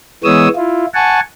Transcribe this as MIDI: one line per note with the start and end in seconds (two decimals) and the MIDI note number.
0.24 0.48 52
0.24 0.48 56
0.24 0.48 59
0.24 0.48 73
0.24 0.48 87
0.24 0.48 88
0.56 0.86 64
0.56 0.86 65
0.94 1.20 78
0.94 1.20 80
0.94 1.20 81
0.94 1.20 85